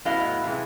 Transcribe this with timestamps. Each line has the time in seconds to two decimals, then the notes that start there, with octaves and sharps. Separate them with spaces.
0.05 A2 F#3 B3 E4 D#5 F5
0.44 C3 E3 G#3